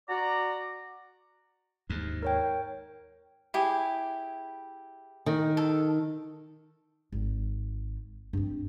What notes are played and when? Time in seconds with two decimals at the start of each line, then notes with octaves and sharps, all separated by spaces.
0.09 F#4 D5 A#5
1.90 D#2 G#2
2.23 A#4 C#5 G5
3.54 E4 G4 G#4
5.26 D#3
5.57 A4
7.12 G#1
8.33 G2 C4